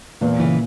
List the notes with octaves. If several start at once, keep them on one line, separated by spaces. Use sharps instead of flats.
E2 A#2
C#3 E3